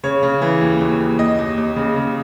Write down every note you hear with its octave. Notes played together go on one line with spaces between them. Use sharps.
C#3 C#5
C#3
E3
D#2
D#2
D#2
D#2 D#5
D#2
D#2
C#3
C#3